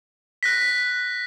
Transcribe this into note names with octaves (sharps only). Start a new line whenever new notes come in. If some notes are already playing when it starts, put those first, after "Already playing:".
F#6 A#6 B6